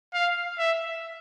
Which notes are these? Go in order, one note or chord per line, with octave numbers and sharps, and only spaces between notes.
F5
E5